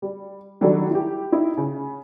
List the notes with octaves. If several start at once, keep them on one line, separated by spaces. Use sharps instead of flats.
G3
D#3 F#3 G3 D4 A4
E4 G4
D#4 E4
C#3